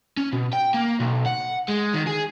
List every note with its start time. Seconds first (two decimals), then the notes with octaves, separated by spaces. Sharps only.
0.17 C#4
0.32 B2
0.53 G5
0.74 A#3
1.00 B1
1.26 F#5
1.68 G#3
1.94 D#3
2.07 G#4